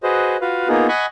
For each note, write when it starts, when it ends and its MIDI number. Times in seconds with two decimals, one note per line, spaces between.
0.03 0.37 66
0.03 0.37 68
0.03 0.37 71
0.03 0.37 72
0.03 0.37 75
0.41 0.68 65
0.41 0.68 66
0.41 0.68 71
0.41 0.68 77
0.69 0.87 58
0.69 0.87 59
0.69 0.87 63
0.69 0.87 65
0.69 0.87 68
0.88 1.06 75
0.88 1.06 78
0.88 1.06 80
0.88 1.06 83
0.88 1.06 85